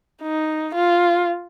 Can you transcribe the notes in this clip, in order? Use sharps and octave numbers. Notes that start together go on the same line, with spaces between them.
D#4
F4